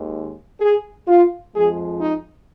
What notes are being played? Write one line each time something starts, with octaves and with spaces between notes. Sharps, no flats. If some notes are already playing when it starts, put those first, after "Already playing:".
Already playing: D#2 D#3 G#3
G#4
F4
F2 F3 G#3 G#4
D#4